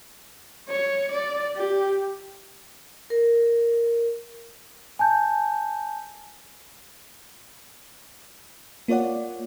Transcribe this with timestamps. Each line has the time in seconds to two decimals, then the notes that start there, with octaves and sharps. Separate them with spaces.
0.69 C#5
1.11 D5
1.56 G4
3.10 A#4
4.99 G#5 A5 G6
8.88 A#3 F4 C#5 D5 F#5